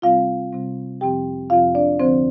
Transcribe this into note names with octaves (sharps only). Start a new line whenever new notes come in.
C3 G3 C4 F4 F5
C3 G3 C4
F2 C3 F3 C4 G4 G5
F2 C3 F3 C4 F4 F5
D4 D5
D2 D3 F3 C4 C5